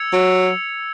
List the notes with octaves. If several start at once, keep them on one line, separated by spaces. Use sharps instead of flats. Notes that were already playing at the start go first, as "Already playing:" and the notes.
Already playing: E6 G#6 C#7 F7
F#3